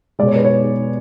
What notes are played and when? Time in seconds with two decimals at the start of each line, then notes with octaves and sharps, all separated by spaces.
0.19 B2 G#3 D5
0.27 C#5
0.36 B4
0.45 C#5